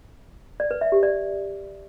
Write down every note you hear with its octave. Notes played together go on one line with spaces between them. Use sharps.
D5
B4
E5
G4
D5